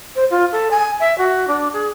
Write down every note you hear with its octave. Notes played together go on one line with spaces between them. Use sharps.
C5
F4
A4
G#5
E5
F#4
D4
G#4